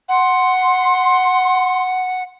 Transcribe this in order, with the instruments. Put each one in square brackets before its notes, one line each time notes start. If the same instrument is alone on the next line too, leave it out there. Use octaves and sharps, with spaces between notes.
[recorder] F#5 [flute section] C6